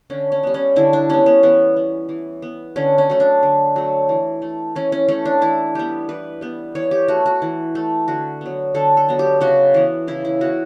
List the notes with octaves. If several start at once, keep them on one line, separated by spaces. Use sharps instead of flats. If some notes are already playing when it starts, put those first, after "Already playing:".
D3 C#4
C#4
G3 B3
C#4
D3 E4
D4
G3 B3 C#4
B3
E3 B3
B3
E3
B3
D3 C#4
C#4
F#3 A3
D4
D3
F#3 A3
E3
A3
E3 C#4
C#4
A3 C#4
D4
E3 E4
G3 B3 G4
E3 B4
G3 B3
E3 C#5
G4
A3 F#4
F#4
E3
A3
D3 F#4
F#3 B3
D3 A4
A4
F#3 B3
G4
C#3 F#4
E3 B3
C#3 E4
E4
E3 B3 F#4